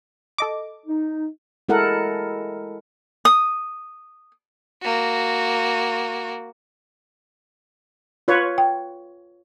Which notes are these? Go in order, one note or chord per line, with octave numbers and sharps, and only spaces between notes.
A4 D#5 D6
D#4
G#3 E4 A4 A#4 F#5
D#6
A#3 F#4
F4 B4 C#5
G5